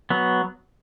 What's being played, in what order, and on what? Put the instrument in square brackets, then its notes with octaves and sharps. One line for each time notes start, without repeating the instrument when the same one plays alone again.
[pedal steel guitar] F#3 B3